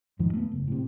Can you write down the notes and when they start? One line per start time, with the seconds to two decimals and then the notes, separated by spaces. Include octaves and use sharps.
0.19 F2 G#2 D#3 F3
0.34 A3 B3
0.52 F#1
0.68 A2 C3